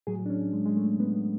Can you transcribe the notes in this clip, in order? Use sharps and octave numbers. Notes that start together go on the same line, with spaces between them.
A2 F#3 G#4
D4
C#4
G#3
G#3
A3
B3